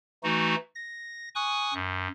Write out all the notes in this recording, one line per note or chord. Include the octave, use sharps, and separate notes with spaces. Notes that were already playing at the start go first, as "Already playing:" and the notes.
E3 A3 D#4 F#4
A#6
G#5 C#6 D#6 F#6
F#2